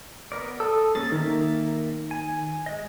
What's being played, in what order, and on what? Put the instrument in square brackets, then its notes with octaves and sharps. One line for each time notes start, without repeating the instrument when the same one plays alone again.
[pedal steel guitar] B3 A#4 D5
[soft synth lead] A4 [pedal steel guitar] D#6 E6
[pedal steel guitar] A#3 C#4 G#4 [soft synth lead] A6
[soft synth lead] D#3 [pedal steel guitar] A#3 A#4 E5
[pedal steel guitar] G#5
G#3 D#5